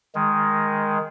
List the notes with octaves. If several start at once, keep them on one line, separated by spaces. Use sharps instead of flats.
D#3 G#3